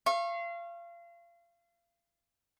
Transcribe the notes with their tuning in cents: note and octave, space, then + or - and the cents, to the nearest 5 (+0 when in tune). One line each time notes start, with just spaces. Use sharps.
F5 -30 C#6 -35